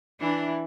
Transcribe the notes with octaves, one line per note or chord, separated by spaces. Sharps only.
E3 D4 E4